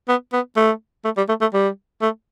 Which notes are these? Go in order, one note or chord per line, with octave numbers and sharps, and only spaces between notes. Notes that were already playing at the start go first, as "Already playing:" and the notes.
B3
B3
A3
A3
G3
A3
A3
G3
A3